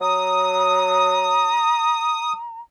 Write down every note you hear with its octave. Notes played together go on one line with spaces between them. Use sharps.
F#3 A#5 D#6